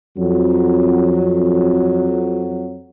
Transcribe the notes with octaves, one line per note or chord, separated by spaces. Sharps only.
F2 F#3